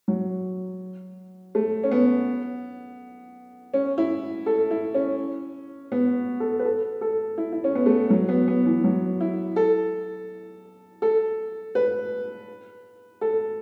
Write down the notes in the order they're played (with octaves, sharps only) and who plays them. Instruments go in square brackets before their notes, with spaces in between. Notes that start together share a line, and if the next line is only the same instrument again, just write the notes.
[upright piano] F#3
A3
C#4
B3
C#4
E4
A4
E4
C#4
B3
A4
B4
A4
A4
E4
E4
C#4
B3
A3
F#3
B3
B3
E3
F#3
E4
A4
A4
B4
A4